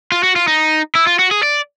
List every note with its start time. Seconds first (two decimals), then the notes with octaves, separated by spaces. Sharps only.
0.12 F4
0.23 F#4
0.36 F4
0.47 D#4
0.95 E4
1.07 F4
1.19 F#4
1.31 G#4
1.43 D5